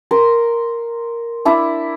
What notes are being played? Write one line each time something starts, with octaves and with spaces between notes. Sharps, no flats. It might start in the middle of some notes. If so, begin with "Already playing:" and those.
A#4 A#5 C6
D4 E4